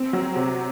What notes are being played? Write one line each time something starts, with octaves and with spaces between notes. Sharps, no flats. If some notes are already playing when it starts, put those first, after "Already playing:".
Already playing: C4
F#3
C3